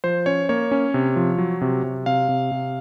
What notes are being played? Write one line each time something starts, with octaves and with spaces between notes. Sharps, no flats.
F3 C5
C#4 C#5
A#3 C#5
C#4
C3
F3
F#3
C3
C3
C3 F5
C3
C3